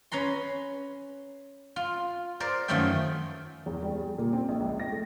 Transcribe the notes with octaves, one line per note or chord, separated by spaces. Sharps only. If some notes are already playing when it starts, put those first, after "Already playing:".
C#4 B4 A#5 C6
F4
A#4 C5 D5
F#2 D#3 F3 A3 E5 G5
E2
G3
G#4
A#2
C4
A#1
C#2
A#6
A3